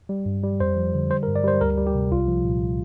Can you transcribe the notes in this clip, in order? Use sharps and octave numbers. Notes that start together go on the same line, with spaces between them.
G3
G2
G3
F2 C5
F3
D3
G3 C5
A#4
G2
D5
G3 C5
D2 A#4
G3
G4
C3
C2 F4
F3
A#2